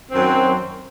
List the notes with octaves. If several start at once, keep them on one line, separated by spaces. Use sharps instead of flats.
F#2 D#3 F#3 C4